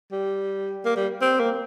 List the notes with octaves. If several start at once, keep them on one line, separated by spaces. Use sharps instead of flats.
G3
A#3
G3
C4
A#3